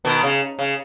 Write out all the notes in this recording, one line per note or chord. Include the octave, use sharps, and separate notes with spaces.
B2 D#3
C#3
C#3